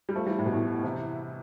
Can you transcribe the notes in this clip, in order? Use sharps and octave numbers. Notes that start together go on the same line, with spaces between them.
G3
F3 A3
E3 G3
A2
B2
A2
C3 E3